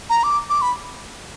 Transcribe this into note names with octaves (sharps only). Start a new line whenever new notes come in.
A#5
D6
D6
B5